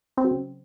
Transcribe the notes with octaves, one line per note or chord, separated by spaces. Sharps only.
C4
F#3
C#3